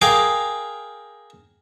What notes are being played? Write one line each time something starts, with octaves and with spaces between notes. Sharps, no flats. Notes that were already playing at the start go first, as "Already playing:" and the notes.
G#4 A#4 F5 G5 D6